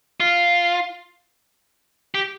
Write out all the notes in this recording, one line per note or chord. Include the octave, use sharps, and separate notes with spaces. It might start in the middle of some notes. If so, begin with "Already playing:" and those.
F4
G4